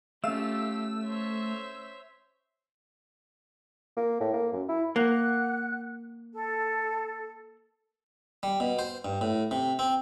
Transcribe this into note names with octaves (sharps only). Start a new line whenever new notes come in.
A3 C#4 F4 G4 F5 E6
C5 C#5 E5
A#3
A2
A#3
F#2
E4
A#3 F#5 F#6
A4
G3
B2
C5
G2
A2
C3
C4